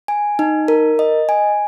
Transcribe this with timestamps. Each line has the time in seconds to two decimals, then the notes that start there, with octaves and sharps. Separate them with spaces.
0.08 G#5
0.39 D#4
0.68 A#4
0.99 D#5
1.29 G#5